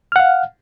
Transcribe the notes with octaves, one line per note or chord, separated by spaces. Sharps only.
F5 F#5 F6